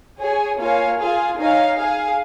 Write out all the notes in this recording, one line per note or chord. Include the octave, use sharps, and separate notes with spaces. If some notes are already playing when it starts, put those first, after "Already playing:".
G#4 C#5 G#5
A#3 F4 C#5 F5 G#5
F4 G#4 F5 G#5
D#4 C#5 F5 G#5
G#4 F5 G#5